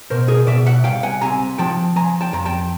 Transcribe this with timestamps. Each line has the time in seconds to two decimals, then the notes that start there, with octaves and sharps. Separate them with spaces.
0.10 B2 A#4 C5
0.28 G#4 A#4
0.47 B2 D5 E5
0.66 E5 F#5
0.84 C2 F5 G5
1.03 F#5 G#5
1.22 C3 G#5 A#5
1.58 F3 G5 A5
1.96 F3 G#5 A#5
2.21 G5 A5
2.33 F2 A#5
2.46 G5 A5